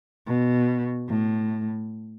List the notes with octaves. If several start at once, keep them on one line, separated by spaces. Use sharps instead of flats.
B2
A2